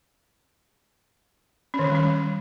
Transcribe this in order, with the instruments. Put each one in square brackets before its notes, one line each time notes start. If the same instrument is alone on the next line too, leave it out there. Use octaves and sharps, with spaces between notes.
[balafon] C#4
D#3
C#4
G3
C#4